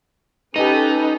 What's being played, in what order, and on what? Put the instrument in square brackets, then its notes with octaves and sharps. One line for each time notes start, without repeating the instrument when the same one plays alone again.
[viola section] C#4 A4 B4 [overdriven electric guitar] D#4 [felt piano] G4 D#5